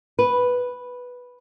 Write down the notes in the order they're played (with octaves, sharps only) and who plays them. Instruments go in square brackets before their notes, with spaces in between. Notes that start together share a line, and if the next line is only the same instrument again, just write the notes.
[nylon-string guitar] B4